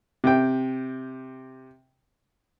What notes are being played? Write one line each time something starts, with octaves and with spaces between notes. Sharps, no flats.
C3 G5